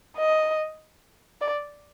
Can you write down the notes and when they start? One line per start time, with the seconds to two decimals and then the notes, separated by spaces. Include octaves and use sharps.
0.17 D#5
1.41 D5